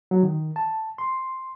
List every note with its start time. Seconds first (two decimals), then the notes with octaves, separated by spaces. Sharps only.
0.11 F#3
0.23 D#3
0.56 A5
0.98 C6